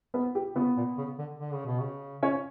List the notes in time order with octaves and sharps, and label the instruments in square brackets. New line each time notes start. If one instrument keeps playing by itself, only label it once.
[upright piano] B3 B4
G4
[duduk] C#3 [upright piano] B3 B4
[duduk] A#2
C#3
D3
D3
C#3
B2
C#3
[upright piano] C#4 C#5